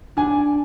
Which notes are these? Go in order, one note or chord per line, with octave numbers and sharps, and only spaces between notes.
D4 G#5